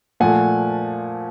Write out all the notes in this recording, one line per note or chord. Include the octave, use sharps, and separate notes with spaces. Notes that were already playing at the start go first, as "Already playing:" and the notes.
A#2 F3 A3 F#5 G#5